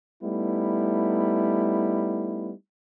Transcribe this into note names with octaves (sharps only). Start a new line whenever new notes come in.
G3 A3 B3 D#4 E4